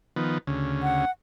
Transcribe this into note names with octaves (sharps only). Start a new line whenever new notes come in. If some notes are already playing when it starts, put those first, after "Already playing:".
D#3 F3 B3
D2 C#3
F#5